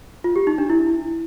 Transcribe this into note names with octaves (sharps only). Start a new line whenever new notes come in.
F4
G4
D#4
D4
E4